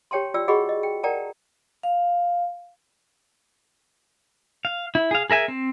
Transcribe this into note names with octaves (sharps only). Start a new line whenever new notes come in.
G4 C#5 G5 A5 C6
F4 D5 G5 E6
F#4 G#4 D#5 F#5 B5 C#6
D#5
G5
A#4 D5 F#5 G5 A5 A#5
F5
F5
E4
G#4 F5
G#4 A#4 E5 G#5
C4